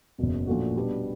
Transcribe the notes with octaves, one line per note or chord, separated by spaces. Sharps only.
F#1 E2 B2
A#2 F3 A3 D4 F#4
B2 G3 B3 D4 G4